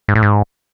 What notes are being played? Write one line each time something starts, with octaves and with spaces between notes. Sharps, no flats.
G#2
A2
G#2